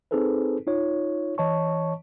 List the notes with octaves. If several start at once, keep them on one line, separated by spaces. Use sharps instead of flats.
C4 D#4 G#4 A4 B4 C5
D#4 F4 C#5
E3 C#5 D#5 A5 C#6